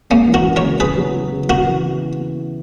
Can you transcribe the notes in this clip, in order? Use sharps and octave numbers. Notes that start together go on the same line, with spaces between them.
G#3 A#3 C#4
E3
F#4 A#4
C#4
A#4 C#5
C#3
B3 G#4 B4
F#3
F#4
C#3
B3 F#4 A#4
E3
E4